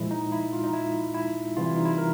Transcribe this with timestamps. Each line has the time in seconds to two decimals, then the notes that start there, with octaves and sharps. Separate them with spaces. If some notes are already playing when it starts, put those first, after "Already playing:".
Already playing: A#2 F3 G#3 E4
0.11 D#4
0.32 E4
0.53 F4
0.64 D#4
0.74 E4
1.14 E4
1.57 C3 E3 G3 F4
1.66 E4
1.75 D#4
1.85 E4
1.98 A#4